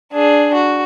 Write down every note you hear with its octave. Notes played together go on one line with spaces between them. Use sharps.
D4 G#4
F#4